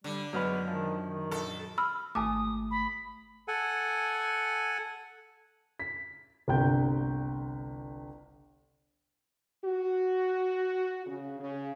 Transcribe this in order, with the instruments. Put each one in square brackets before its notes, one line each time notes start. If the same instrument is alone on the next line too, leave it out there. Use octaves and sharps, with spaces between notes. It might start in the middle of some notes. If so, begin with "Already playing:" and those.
[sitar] D3 [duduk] G3
[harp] F#2 F6 [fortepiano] F#3 B3 B4 [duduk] G#3
[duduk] D#3 [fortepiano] F3
[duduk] D#3
[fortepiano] A#1 [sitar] A4
[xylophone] B5 E6 F6
[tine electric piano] G#1 A3 [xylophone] G#5 A5 D6 [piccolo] D#6
[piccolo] B5
[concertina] A4 F#5 G#5
[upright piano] B6
G1 C2 D3 G5 G6
[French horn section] F#4
C#3
C#3